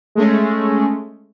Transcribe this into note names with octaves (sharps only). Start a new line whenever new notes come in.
G#3 A3 C#4